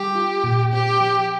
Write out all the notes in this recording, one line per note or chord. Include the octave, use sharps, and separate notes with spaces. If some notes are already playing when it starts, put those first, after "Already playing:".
Already playing: G3 G4
F4
A#2
C4 G4
F3